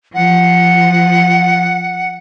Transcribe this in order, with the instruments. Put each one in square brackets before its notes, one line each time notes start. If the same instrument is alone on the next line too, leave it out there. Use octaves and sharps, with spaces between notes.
[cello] F3 [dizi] F#5